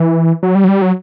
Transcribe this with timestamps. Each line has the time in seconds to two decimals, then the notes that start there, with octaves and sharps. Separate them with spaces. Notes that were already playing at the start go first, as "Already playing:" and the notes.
Already playing: E3
0.43 F#3
0.55 G3
0.64 F#3
0.68 G3
0.82 F#3